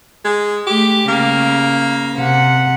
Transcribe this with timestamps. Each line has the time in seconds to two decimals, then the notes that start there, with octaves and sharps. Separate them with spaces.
0.25 G#3
0.67 A3 G4
1.08 C#3 A#3
2.16 C3 F#5